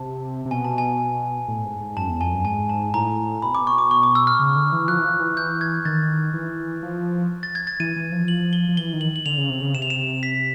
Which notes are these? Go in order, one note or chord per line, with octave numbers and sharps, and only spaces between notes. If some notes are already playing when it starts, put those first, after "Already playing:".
Already playing: C3 A5
C3
B2 G#5
A5
G#5
A2
G#2
G#2
F#2 A5
E2
F2 G#5
F#2
G#2 G#5
A5
A2 A#5
B2 B5
C3 D6
B2
C#6
D6
C#6
D6
E6
F6
C#3
D3
E3
F3 F#6
E3
F3
E3
G6
G#6
D#3 A6
E3
F3
A6
G#6
A6
E3 D#7
E3
F3
F#7
G7
F3
E3 G7
D#3
F#7
F#7
D3 F7
C#3
C3
C#3
C3 E7
F7
E7
B6